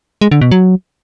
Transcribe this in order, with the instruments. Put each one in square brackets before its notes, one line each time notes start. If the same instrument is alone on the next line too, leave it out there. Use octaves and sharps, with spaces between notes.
[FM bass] G#3
D3
B2
F#3